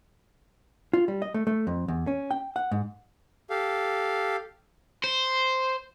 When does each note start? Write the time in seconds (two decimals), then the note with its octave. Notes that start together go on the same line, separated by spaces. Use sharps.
0.93 F4
1.08 G3
1.22 D#5
1.34 A3
1.47 A3
1.67 F2
1.88 E2
2.07 C#4
2.31 G5
2.56 F#5
2.72 G#2
3.50 G4 A4 F5
5.04 C5